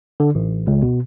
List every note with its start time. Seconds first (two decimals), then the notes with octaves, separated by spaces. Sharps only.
0.20 D3
0.35 A1
0.67 C#2
0.82 B2